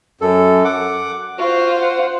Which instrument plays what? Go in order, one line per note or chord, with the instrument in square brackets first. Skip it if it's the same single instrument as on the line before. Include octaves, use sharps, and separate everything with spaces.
[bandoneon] F#2 A4
F#5 D6
[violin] F4 C5 [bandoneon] F#4
[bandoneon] F#5